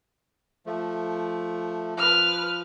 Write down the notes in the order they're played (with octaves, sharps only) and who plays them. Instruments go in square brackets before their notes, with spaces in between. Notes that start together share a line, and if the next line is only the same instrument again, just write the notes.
[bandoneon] F3 A3
[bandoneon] F3 [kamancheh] B4 F6